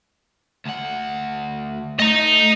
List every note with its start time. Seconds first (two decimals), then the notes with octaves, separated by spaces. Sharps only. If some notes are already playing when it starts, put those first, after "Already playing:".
0.66 D2 F#5
2.00 A3 D#5 A#5